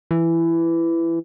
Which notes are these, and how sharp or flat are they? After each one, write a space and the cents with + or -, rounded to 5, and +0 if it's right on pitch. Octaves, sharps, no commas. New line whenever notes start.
E3 +15